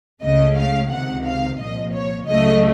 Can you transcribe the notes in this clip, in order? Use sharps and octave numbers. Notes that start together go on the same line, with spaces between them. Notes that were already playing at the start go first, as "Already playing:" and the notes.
C#2 C#3 A3 D#5
F5
C#2 C3 D#3 F#5
F5
C2 A#2 F3 D#5
C#5
C#2 C#3 F#3 A3 D#5